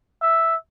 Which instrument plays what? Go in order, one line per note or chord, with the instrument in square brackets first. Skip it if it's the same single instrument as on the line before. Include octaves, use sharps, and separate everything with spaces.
[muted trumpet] E5